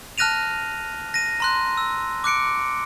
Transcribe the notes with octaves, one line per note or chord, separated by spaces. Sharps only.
A5 F6 F#6 A#6 D#7 F7
A#6 D#7
A#5 C6 F#6
E6
D6 F#6 C#7 D7